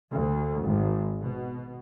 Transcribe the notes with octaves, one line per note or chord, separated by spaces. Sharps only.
D2
G#1
B2